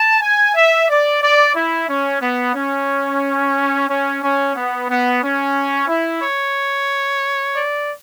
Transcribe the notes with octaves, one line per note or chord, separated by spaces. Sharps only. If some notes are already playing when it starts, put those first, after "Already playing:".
Already playing: A5
G#5
E5
D5
D5
E4
C#4
B3
C#4
C#4
C#4
B3
B3
C#4
E4
C#5
D5